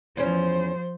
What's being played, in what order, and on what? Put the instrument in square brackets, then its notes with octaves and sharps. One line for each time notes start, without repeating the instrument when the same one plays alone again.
[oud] E2 C#4 [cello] F3 C5